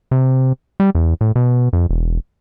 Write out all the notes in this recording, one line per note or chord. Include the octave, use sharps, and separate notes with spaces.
C3
G3
E2
A2
B2
F2
E1